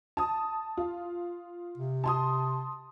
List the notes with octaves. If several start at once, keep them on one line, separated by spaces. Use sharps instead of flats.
A5 D#6
F4
C3
A5 C6 D#6